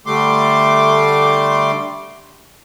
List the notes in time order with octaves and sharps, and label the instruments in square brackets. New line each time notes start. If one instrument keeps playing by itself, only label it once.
[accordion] D3 G3 A3 C6 D6